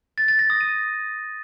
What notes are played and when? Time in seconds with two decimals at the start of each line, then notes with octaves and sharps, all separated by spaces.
0.18 A6
0.28 A6
0.39 A#6
0.50 D#6
0.61 D#7